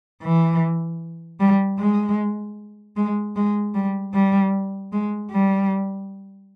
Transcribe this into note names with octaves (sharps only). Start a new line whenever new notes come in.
E3
G3
G#3
G#3
G#3
G3
G3
G#3
G3